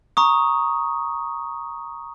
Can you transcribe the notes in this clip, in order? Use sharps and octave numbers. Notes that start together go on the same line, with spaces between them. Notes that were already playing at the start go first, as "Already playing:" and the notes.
A#5 C#6 D#6